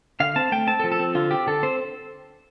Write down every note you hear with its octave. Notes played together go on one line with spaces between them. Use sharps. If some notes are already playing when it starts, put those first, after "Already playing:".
D3 F5
C4 A5
A3 G5
C4 A5
A4
F3
A4
C4
D3 F4
C4 G4
D3 A4
C4 C5